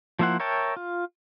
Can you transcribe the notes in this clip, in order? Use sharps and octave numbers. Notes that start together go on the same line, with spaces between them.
F3 A#3 E4 C5 F#5
A#4 C#5 E5 G5 A5
F4